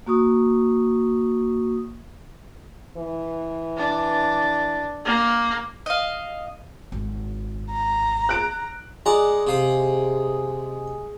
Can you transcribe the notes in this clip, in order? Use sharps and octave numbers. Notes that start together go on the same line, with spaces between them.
A#3 F#4 C#6 D#6
E3
D4
A#3
D#5 F5
G#1
A#5
F#6 D7
G#3 D5 F#5 A#5
C3 F5 D#6